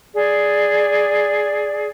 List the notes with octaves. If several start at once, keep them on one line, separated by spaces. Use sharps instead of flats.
G#4 D5